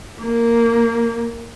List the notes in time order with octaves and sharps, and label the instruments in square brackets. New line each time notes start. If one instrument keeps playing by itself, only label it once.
[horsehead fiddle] A#3